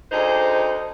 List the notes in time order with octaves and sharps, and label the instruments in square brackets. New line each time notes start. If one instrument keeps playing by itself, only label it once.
[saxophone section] D2 D#4 G#4 C5